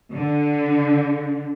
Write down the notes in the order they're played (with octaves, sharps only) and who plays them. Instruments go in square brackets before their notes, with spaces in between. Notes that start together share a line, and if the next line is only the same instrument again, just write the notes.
[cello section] D3